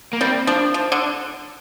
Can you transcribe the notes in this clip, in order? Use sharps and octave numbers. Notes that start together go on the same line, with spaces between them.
A#3
G3 C4
F3 D4
F3
D3